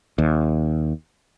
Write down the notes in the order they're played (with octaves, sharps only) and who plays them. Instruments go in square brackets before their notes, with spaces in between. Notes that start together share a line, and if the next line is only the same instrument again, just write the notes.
[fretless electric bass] D#2